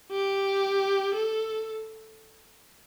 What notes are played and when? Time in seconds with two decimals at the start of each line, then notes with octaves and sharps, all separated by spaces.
0.12 G4
1.14 A4